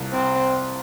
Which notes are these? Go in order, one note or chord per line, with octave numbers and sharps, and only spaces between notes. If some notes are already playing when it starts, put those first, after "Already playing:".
Already playing: C2 F3 A#3
C3 C4